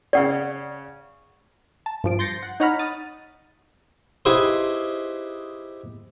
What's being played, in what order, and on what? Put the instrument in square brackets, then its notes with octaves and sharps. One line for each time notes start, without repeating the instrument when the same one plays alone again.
[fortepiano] C#3 C#4 [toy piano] D5 F#5
[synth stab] A5
G2 F3 D7
C6 G6 A6 A#6 C7 C#7
F#5
D#4 C#5 F#5 A#5 B5 F6
D#6 A6
[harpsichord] D#4 E4 G4 G#4 B4 C5